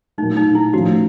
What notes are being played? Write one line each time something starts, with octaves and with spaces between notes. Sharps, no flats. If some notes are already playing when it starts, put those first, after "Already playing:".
A#2 F#3 A3 D#4
D#4
E4
A2 F3 A3 C#4 F#4